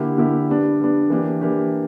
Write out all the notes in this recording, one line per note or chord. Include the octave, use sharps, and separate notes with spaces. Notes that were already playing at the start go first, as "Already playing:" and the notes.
Already playing: D3 A#3 E4 G4
D3 A#3 E4 G4
G3 B3 D4
G3 B3 D4
E3 A#3 D4 G4
E3 A#3 D4 G4